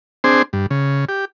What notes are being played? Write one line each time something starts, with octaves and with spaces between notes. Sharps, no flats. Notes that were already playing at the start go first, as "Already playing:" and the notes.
C4 D4 G#4 C5
G2
C#3
G4